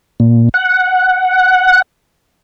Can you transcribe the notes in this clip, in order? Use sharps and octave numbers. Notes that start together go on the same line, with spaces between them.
A#2
F#5